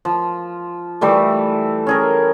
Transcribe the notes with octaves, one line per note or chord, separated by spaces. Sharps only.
F3
E3 G3 A3
C#4 G#4 A#4